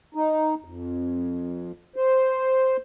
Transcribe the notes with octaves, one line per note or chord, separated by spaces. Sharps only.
D#4
F2
C5